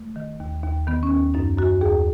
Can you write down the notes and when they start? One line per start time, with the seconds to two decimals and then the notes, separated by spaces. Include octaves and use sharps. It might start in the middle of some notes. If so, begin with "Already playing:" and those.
Already playing: A3
0.16 D#3
0.40 D#2
0.63 D#2
0.87 D#3 B3
1.03 C#4
1.11 D#2
1.34 F#2 D#4
1.58 F#2 F#4
1.81 D#2 G#4